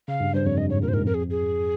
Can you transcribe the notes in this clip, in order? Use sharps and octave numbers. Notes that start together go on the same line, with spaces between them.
C#3 F5
G2
G2 C5
F2 C#5
G2 D#5
G#2 C#5
A#2 A#4
C5
G#2 A#4
F2 A#4
G#4
G#4